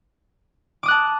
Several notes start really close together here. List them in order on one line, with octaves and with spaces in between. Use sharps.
D6 D#6 F#6 A5